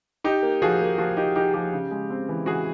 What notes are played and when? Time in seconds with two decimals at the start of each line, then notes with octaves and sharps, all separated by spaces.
0.24 D#4 G4
0.43 A#3
0.62 F3 F#4 G#4
0.81 A#3
0.98 F3 F#4
1.17 D#4 G4
1.36 D#4 G4
1.54 F3 G4
1.73 C#3
1.91 G#3
2.10 C4
2.29 E3
2.46 E3 F#4 G#4